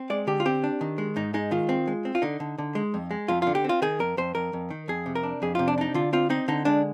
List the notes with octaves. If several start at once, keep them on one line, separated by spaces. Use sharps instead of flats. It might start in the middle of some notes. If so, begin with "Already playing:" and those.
Already playing: C4
G#3 D5
D3 G4
F4
C4 G4
D4
D#3
G#3
G#2 D#4
G#3 D#4
D#3 F4
C4
G#3
C4
F4
D3 D#4
D3
D3
G#3
F2
G#3
F2 F4
D3 F4
G4
C4 F4
D#3 G#4
F2 A#4
F2 C5
F2 A#4
F2
D#3
F2 G#4
C3
A#4
D4
F2 G#4
C3 F4
D4
D4 D#4
D3 F4
C4 F4
C4 D#4
D3 D#4
G#3 D4